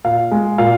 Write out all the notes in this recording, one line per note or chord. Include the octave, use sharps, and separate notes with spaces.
A#2 F5
G#3
A#2 F5